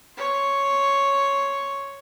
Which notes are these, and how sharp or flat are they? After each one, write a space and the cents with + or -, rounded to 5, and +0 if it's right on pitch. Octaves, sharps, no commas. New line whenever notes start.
C#5 +0 C6 +0